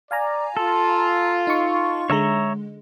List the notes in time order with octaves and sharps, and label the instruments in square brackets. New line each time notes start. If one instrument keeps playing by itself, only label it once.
[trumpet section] D5 [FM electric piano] F5 G#5 A#5
[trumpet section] F4 [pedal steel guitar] A4
[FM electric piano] D#4 C#6
[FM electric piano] D3 G#3 [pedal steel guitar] C#5 E5 A#5